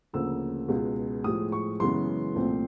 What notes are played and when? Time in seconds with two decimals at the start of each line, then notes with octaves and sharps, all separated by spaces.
0.13 D2 C#3 F3 A#3 E6
0.68 C#2 B2 G#3
1.24 A2 F3 G#3 D#6
1.52 C#6
1.80 F#2 C#3 E3 G#3 B3 C6
2.35 C2 A#2 F3 A3 C4